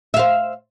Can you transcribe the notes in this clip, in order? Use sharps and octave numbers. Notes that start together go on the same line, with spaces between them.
C5 E5 F5